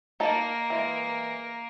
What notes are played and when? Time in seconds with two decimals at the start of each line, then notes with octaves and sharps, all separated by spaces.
0.20 A#3 D#4 A#4 A5
0.70 E3 G#3